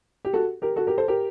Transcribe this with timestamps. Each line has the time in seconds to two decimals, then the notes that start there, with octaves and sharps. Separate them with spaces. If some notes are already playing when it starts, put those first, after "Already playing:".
0.25 G4
0.33 F#4 A4
0.62 G4 A#4
0.76 F#4 A4
0.87 G4 A#4
0.98 A4 C5
1.08 G4 A#4